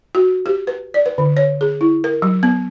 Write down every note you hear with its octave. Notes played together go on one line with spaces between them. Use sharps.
F#4
G4
B4
D5
B4
D3
C#5
G#4
E4
A#4
F#3
B3